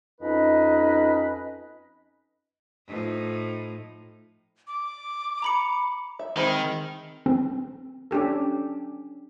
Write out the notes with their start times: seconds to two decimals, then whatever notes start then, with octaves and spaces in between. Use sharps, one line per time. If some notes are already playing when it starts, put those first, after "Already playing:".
0.21 F2 C#4 D#4 B4 D#5
2.87 A2 F3 D#4
4.67 D6
5.42 A#5 B5 C#7
6.19 E5
6.37 D#3 G#3 C4 B5
7.26 C4
8.11 C#4 D4 G4 A4